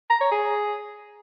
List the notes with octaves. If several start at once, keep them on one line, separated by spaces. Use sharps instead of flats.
A#5
C#5
G#4